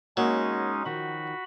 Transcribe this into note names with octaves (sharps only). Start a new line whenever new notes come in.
F#3 G#3 A#3 C#4 D#4 F#4
D#3 F3 F#4 B5